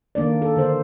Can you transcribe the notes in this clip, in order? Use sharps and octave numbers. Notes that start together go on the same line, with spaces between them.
D#3 A#3 D4 D5
A4
D3 C5